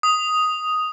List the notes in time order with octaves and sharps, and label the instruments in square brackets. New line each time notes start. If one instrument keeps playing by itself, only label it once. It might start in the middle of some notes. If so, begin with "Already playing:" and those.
[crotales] D#6